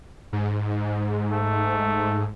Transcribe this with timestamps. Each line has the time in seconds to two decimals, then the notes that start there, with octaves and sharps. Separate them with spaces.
0.33 G#2
1.32 A3